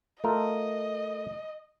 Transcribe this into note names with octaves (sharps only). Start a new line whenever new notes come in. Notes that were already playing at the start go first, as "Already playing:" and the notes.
A3 F4 A#4 D#5